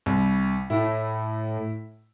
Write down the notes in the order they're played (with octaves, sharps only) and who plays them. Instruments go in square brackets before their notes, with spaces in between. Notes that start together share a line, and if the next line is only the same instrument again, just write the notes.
[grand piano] C2
[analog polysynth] A2 [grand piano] E4